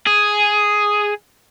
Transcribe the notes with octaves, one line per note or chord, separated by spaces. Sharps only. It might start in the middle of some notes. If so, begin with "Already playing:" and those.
G#4